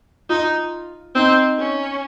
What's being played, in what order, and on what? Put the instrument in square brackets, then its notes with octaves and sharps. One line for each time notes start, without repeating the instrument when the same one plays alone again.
[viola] D#4 [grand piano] F4
[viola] C4 [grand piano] D#4
[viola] C#4